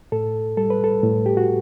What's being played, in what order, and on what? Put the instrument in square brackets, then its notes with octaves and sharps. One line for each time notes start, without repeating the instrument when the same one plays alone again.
[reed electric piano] A2 A4
G3 A4
B4
A4
A2
G4
F#4